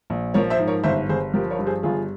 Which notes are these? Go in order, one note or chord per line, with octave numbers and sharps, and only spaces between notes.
A#1
F3 A#4 C#5
C5 E5
G#2
A#4 C#5
G1 C5 E5
G1 G#4 C5
F3 G4 A#4
A#4 C#5
G2
G#4 C5
G1 F4 G#4